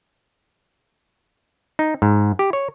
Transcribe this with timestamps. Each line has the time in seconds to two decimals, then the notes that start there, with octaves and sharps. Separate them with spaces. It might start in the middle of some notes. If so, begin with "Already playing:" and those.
1.79 D#4
2.02 G#2
2.39 G4
2.53 C#5